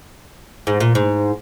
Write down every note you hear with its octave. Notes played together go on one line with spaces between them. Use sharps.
G#2
A#2
G#2